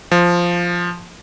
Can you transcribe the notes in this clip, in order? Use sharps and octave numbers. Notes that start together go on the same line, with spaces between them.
F3